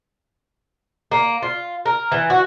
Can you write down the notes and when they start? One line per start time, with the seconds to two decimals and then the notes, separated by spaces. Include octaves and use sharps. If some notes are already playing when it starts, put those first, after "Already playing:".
1.11 A#3
1.42 F4
1.86 A#4
2.12 E3
2.30 F#4